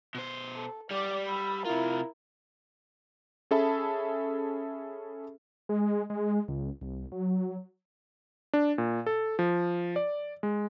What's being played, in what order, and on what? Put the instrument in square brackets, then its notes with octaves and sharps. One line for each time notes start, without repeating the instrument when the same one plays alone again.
[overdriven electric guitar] B2 C5
[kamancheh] A4
[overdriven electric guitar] G3 G4 [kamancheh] D5 D6
[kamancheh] B5 E6
[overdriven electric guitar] C3 F4 [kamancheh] E4 A#4
[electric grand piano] C#4 G#4 A4 E5 A5 B5
[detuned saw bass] G#3
G#3
C#2
C2
F#3
[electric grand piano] D4
A#2
A4
F3
D5
G#3